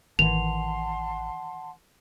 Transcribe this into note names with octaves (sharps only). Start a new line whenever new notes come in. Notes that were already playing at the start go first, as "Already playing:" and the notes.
A1 D#3 E3 F#5 A5 C6 F7